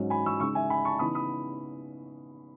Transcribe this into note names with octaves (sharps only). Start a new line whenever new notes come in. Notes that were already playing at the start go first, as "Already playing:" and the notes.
Already playing: G#2 F#3 C#4
G#5 B5
C#6 E6
C#3 G#3 D#4 C#6 E6
E5 G#5
G#5 B5
A5 C#6
C#3 E3 B3 D#4 B5 D#6
B5 D#6